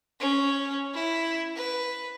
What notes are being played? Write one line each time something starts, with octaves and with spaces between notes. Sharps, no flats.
C#4
E4
B4